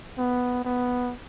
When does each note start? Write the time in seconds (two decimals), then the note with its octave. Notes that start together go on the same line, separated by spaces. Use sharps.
0.18 B3
0.65 B3